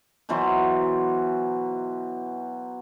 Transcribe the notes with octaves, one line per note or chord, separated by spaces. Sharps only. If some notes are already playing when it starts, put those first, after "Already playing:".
B2 E3 F#3 C5